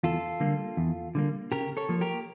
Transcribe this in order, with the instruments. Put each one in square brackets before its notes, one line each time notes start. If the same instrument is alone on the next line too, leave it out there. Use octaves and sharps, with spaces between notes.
[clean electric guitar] E2 F4 A4
D3 G3 A#3
E2
D3 G3 A#3
C#3 G4 A#4
A4 C#5
F3 A#3
G4 A#4